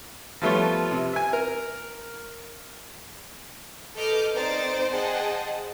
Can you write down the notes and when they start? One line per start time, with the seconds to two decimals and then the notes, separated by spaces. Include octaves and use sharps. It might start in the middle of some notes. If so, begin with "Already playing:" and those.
0.42 F3 G3 A3 B3 F4 C#5
0.91 C3
1.13 E5 G#5
1.33 A#4
3.96 A4 B4 D#5 D6 F6 G6
4.35 C4 D#4 C5 D5 A6 D7
4.91 G#4 C5 D#5 F#5 G5 A5